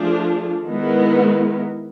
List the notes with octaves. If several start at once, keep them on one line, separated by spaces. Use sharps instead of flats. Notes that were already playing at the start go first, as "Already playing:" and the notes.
Already playing: F3 A3 D4 F4 G#4
D#3 G#3 B3 E4